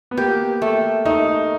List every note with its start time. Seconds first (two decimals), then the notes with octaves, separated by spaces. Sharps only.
0.11 B3
0.17 A#3 G4
0.62 A3
1.05 A3 D#4